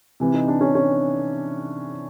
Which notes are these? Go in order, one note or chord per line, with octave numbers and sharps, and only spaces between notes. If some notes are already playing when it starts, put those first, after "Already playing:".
C3 E3
D#4
D4
C#4
C#4